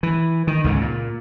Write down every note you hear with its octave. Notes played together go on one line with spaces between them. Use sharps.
E3
D#3
C#2 G#2 C#3
A#2